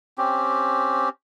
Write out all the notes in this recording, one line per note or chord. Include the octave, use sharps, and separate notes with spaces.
C4 C#4 G4